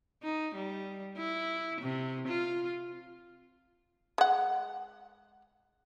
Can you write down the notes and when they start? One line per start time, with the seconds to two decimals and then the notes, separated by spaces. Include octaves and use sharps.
0.23 D#4
0.55 G3
1.18 E4
1.81 C3
2.28 F4
4.18 G#3 F#5